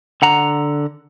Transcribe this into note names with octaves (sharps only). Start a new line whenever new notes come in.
D3 F#5 A#5